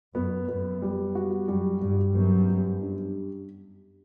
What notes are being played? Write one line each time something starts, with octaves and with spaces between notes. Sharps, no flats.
F#2 B3
F#2 B3
G3
F#4
F#2 G3
G2 G3
F#2 B3
G3
D4